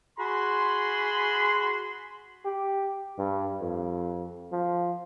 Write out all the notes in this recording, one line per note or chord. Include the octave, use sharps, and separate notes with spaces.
F#4 G#4 B5 C6
G4
G2
F2
F3